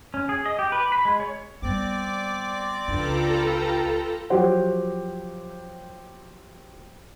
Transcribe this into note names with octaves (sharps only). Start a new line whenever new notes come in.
C#4
G#4
D#5
G4
B4
B5
G#3
C#5
G3 B3 C4 D5 D6
C#2 D4 F4 G4 A4 B4 A#5
F3 F#3 G4 C5 F#5